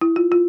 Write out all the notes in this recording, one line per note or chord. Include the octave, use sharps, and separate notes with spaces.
E4
F4
F4